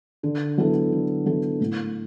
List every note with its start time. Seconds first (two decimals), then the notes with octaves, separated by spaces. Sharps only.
0.23 D3
0.58 F#3 B3 E4 A4
0.92 D3
1.26 F#3 B3 E4 A4
1.60 A2